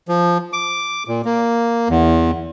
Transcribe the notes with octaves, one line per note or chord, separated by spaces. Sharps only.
F3
D6
A#2
A#3
E2